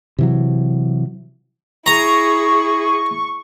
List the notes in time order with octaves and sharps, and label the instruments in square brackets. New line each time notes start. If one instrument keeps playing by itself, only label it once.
[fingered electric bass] C3 E3 F#3
[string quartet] E4 G#4 [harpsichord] A#5 [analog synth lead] C#6